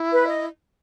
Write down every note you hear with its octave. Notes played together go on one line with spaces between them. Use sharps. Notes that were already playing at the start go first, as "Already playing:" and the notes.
Already playing: E4
B4
D#5